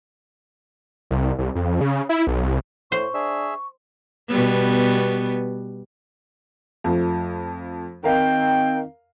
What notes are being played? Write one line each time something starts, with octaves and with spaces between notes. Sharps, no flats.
C2
C2
F2
C#3
E4
B1
C2
A2 C5 C#6
D4 G#4 E5 E6
B2 G3 B3
F2 F3 A3
D#3 C4 A#4 F5 G5